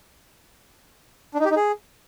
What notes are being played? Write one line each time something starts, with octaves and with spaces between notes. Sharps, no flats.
D4
D#4
G4
D#4
G#4